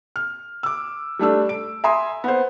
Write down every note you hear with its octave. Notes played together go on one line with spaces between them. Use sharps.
F6
D6 E6
G3 A3 D4 E6
D7
E5 G#5 A#5 C6 D#6
B3 C5